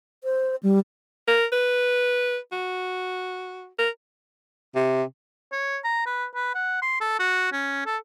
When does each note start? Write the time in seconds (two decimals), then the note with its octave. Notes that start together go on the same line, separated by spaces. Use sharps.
0.24 C5
0.63 G3
1.28 A#4
1.53 B4
2.53 F#4
3.79 A#4
4.75 C3
5.52 C#5
5.84 A#5
6.06 B4
6.35 B4
6.55 F#5
6.82 C6
7.00 A4
7.19 F#4
7.52 C#4
7.86 A4